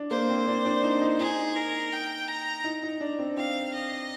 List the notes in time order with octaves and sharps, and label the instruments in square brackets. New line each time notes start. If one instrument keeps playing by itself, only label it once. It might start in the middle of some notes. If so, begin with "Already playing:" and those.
Already playing: [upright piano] D4
[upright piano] A#3 [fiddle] C5
[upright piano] C4
D4
D4
D#4
D#4
[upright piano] D#4 [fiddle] G#4
[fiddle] A#4
G5
A#5
[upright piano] D#4
D#4
D4
C4
[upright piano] C4 [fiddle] F5
[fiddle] D#5